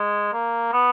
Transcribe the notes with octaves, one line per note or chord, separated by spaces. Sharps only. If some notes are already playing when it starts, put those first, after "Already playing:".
Already playing: G#3
A#3
B3